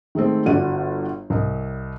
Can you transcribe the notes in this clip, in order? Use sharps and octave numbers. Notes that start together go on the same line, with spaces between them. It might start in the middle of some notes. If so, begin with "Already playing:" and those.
D#3 G#3 A3 C4
G1 F#4 D5 D#7
C2 D#5